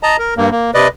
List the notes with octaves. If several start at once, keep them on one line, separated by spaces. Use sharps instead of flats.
D#5 A5 A#5
A#4
G2 A#3
A#3
C3 B4 D5 D#5